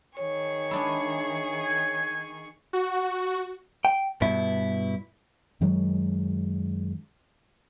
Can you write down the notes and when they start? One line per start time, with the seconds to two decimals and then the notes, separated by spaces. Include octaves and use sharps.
0.17 D#3 G#4 C#5 C#6
0.71 G#3 D4 E4
1.65 G#6
2.73 F#4
3.85 G5
4.22 G2 B2 E4
5.61 F#2 D#3 F#3 G#3